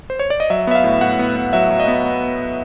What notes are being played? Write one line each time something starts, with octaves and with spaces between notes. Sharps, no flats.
C5
C#5
D5
D#5
F#3 E5
B3 E5
F5
A2
A2 F#5
B3
B3
F#3 E5
F#3
D#5
B3
B3